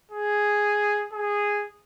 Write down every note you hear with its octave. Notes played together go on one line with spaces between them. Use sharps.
G#4
G#4